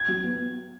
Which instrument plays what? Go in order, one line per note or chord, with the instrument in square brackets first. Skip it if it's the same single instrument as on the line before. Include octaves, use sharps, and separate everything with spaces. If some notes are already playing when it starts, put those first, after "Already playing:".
Already playing: [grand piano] G#6
[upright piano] F#3
B3